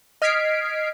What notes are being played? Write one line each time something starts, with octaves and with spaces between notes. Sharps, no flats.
D#5 F6 G#6 B6 C7 D7